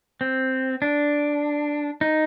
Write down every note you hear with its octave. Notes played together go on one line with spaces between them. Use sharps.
C4
D4
D#4